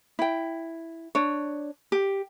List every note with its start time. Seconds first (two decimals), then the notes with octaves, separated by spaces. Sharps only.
0.19 E4 G5
1.15 D4 C#5
1.92 G4